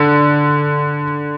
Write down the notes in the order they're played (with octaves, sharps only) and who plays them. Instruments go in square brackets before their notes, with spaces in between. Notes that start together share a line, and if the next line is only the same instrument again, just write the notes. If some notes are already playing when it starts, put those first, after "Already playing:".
Already playing: [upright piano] D3